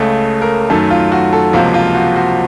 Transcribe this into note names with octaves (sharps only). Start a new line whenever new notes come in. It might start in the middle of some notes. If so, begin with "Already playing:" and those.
Already playing: C#2 C#3 A3
A#4
F#2 D#3 A3 A4
F4
F#4
A4
C#2 C3 F3 A#3 F#4
F4
F#4
F#4